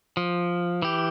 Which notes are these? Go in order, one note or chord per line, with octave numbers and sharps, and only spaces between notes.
F3
E3 G4